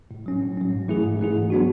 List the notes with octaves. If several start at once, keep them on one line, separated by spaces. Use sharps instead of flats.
A2
F#3 C#4
A2
F#3 C#4
G#2
E3 A3 E4 G#4
G#2
E3 A3 E4 G#4
G#2
F#3 B3 D4 F#4